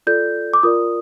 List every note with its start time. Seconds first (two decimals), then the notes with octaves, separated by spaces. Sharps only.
0.07 F4 A4 D5 G6
0.54 D6
0.63 F4 A#4 D5 D#6